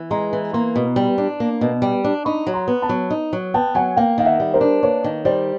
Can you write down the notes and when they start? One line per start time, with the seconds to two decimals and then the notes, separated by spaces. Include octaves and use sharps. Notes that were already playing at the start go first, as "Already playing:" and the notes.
Already playing: E3
0.11 G#3 A#5 C6
0.33 E3
0.53 A#3 A#5 C6
0.76 B2
0.96 G3
1.18 D4
1.40 A#3
1.61 B2
1.82 G3
2.04 D4
2.25 D#4 B5 C#6
2.47 F#3
2.54 A#5 C6
2.68 B3
2.82 A5 B5
2.89 F#3
3.10 D#4
3.33 F#3
3.54 B3 G5 A5
3.75 F#3 F#5 G#5
3.97 A#3 F5 G5
4.18 D#3 F5
4.25 E5 F#5
4.40 G3
4.54 A#4 C5
4.61 D4
4.83 A#3 B4 C#5
5.04 D#3
5.25 G3 C5 D5